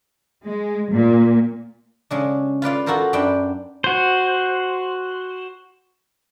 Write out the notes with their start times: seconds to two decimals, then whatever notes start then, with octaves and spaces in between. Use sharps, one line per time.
0.45 G#3
0.92 A#2
2.10 C#3 G#3 D4
2.62 F4 B4 D5 F5
2.86 F4 F#4 A4 A#4 C5
3.13 F#2 D4 G5 B5
3.84 F#4 C5